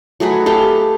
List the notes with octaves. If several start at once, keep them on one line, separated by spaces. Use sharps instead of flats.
F#3 A3 G#4 B4
G4 A4 F5 G5